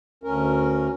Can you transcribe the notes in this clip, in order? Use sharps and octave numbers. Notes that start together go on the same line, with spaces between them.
D2 C#4 A#4